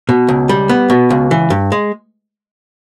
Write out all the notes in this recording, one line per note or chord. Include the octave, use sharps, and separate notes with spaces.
B2
C#2
G3
B3
B2
C#2
E3
G2
G#3